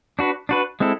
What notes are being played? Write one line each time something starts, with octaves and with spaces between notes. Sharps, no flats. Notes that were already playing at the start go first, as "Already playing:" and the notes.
D4 F#4 B4
D4 F#4 B4
G#3 C4 E4 A4